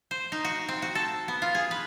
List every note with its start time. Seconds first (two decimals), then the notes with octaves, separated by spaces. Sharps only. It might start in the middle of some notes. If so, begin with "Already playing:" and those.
0.11 C5
0.32 D#4
0.45 F#4
0.69 C4
0.82 F#4
0.95 A4
1.28 B3
1.42 F4
1.55 G#4
1.71 B4